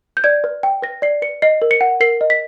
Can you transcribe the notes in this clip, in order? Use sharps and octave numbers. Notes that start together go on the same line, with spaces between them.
G6
D5 G#6
B4
G5
B4 A#6
D5 C7
B4 C#7
D#5 C7
A#4
C#7
F#5
A#4 C7
D#5
B6